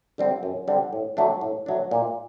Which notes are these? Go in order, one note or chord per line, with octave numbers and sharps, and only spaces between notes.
D3 G3 C4
F#2
D3 G3 C4
A2
F#3 A3 D4
A2
F#3 A3 D4
A#2